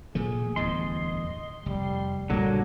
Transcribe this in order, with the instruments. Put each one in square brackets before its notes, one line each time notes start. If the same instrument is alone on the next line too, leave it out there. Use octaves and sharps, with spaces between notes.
[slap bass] A#2 F3 A3 [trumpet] G#4
[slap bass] D1 E2 G2 [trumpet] D#5 [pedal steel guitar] C6
[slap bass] F1 [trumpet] G3
[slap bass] A#1 G2 G3 [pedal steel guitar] D3 F#3 A#3 [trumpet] D4